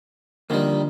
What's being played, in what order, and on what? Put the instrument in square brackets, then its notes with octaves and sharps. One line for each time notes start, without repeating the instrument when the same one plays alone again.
[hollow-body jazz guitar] D3 F3 A#3 [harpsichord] D#3 G3